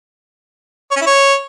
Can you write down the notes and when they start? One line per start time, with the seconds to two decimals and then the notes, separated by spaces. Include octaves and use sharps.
0.91 C#5
0.96 C#4
1.01 E4
1.07 C#5